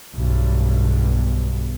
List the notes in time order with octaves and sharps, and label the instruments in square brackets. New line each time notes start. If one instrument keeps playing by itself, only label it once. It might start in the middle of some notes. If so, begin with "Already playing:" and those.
[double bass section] B1 G2